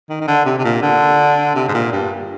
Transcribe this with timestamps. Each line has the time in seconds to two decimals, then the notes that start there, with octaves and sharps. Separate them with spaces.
0.10 D#3
0.21 D#3
0.28 D3
0.46 C3
0.59 C3
0.65 A#2
0.83 D3
1.56 C3
1.68 G#2
1.74 A#2
1.93 G2